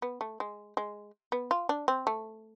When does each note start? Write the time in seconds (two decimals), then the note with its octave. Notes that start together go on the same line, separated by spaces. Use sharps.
0.02 B3
0.21 A3
0.40 G#3
0.77 G#3
1.32 B3
1.51 F4
1.69 D4
1.88 C4
2.07 A3